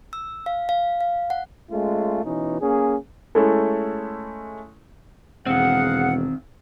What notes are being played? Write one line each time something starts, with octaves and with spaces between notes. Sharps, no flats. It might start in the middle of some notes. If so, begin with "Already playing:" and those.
E6
F5
F5
F5
F#5
G#3 A3 C#4 F4
B2 E3 C#4 D#4
A#3 C#4 G#4
G#3 A3 C#4 E4 A4
E1 D#3 C4 G#4 F5 F#5